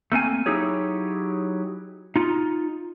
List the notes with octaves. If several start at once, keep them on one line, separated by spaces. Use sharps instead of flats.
A3 A#3 C4 G#5
F#3 D#4 E4 G4 G#4 C#5
D#4 F4